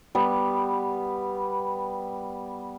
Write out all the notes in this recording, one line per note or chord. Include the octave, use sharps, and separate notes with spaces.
G3 B3